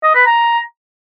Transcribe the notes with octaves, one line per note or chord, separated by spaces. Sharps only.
D#5
B4
A#5